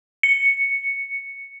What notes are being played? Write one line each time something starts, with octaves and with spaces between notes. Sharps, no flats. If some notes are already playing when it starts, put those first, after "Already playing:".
C#7